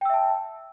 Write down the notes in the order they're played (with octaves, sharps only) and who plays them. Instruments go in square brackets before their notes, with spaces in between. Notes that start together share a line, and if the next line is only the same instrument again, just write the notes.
[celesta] G5
E6
E5
A5